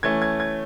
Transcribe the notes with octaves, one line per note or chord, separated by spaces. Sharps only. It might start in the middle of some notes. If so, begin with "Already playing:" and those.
E3 A3 C#4 G#6
G#6
G#6